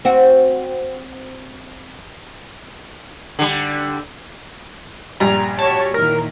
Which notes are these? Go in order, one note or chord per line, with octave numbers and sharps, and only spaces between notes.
C4 F#4
D3 G3
A#1 G2 G3 A#5
F#4 G4 C#5 A5
A#2 D#3 E3 A#4